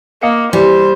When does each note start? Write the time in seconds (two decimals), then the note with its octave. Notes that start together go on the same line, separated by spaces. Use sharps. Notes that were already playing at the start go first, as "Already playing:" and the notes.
0.22 A#3 D#5 F5 C#7
0.53 E3 G3 C5